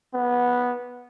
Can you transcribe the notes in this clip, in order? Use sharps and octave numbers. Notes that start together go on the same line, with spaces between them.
B3